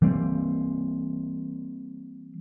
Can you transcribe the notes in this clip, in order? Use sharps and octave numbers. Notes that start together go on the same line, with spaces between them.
E3 G3 A#3 C4